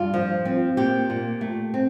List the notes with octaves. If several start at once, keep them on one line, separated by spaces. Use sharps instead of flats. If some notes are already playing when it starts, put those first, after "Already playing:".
Already playing: G2 F4
F3
C4
A#2 G4
A#2
A3
C4